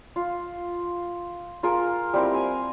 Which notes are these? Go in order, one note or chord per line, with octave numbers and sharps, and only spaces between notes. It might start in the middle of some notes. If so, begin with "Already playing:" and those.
F4
F4 G#4 A#4
G3 C4 E4 A#4
F5 G#5